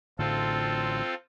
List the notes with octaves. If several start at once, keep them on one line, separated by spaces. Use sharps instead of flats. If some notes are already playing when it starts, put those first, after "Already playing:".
A1 A2 D3 C4 F4 A4